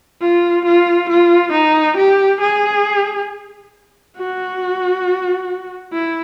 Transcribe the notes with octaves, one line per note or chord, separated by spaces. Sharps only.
F4
F4
F4
D#4
G4
G#4
F#4
E4